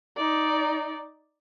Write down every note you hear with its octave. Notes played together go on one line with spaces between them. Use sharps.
D#4 D5